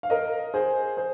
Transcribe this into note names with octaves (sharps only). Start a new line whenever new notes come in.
F5
A#4 D#5
G#4 C5
G#4 C5